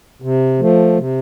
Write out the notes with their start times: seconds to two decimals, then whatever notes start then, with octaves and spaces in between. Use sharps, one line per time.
0.22 C3
0.60 F3 A3
0.98 C3